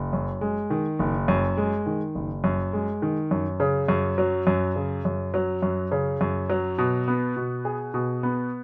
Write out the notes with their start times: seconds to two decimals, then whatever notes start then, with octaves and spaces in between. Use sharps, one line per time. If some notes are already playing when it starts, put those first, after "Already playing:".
Already playing: F#1
0.13 F#2
0.41 G#3
0.70 D#3
0.99 F#1
1.28 F#2
1.57 G#3
1.86 D#3
2.15 F#1
2.44 F#2
2.73 G#3
3.02 D#3
3.31 F#2
3.60 C#3
3.89 F#2
4.18 F#3
4.47 F#2
4.76 C#3
5.05 F#2
5.34 F#3
5.62 F#2
5.91 C#3
6.21 F#2
6.50 F#3
6.78 B2
7.08 B3
7.36 B2
7.65 G#4
7.94 B2
8.23 B3